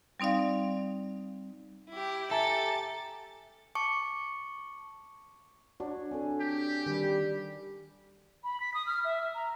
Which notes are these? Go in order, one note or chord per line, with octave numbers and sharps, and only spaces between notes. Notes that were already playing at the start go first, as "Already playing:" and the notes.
G3 C4 D#4 D5 F5
E4 G4
G4 A4 E5 G#5 A#5 A6
A5 C#6 D6 C#7
D4 F#4 C#5
C4 D4 A4 G#5
G4
D#3 G3 D4
B5
B6
D#6
F6
E5
A#5